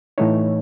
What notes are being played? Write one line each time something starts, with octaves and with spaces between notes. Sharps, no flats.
A2 E3 A3 D#4 C#5